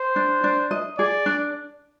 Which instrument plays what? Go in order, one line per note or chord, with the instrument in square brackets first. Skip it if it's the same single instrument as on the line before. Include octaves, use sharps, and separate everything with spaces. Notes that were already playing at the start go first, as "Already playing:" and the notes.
Already playing: [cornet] C5
[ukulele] D4
D4
D#5
[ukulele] G#4 [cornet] D5
[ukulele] D4